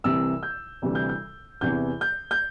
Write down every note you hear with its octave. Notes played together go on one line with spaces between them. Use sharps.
C2 C3 E3 E6
G6
D2 C3 E3 G3
G6
G6
E2 C3 E3 G6
G6
G6